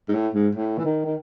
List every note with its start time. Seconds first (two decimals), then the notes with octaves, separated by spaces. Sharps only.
0.09 G#2
0.14 A2
0.34 G#2
0.55 A2
0.78 E3
0.85 D#3
1.05 D#3